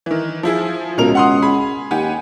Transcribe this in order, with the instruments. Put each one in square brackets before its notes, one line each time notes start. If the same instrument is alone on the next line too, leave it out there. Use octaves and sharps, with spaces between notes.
[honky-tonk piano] D#3 E3
F3 E4 G#4
[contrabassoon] C#2 [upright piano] B2 A#4 F7
[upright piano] F#5 C6 D#6
[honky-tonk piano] G#4 [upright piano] B5
[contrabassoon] D#2 [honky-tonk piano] G4 F#5 G#5